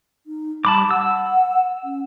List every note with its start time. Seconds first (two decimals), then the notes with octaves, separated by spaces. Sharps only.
0.26 D#4
0.65 G3 A5 B5 D6
0.91 F#5 E6
1.84 C#4